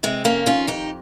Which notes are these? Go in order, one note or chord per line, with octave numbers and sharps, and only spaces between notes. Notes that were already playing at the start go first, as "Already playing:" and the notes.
C3 G#3 C4
F2 A#3 C#4
D#3 C#4 F4
F2 D#4 G4